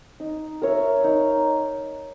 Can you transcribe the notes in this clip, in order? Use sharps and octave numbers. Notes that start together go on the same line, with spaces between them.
D#4
A#4 C#5 E5
D#4